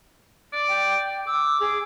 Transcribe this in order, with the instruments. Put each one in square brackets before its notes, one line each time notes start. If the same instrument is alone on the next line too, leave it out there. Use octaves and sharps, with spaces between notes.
[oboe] D5
[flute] G5
[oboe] D6 [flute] E6
[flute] G#4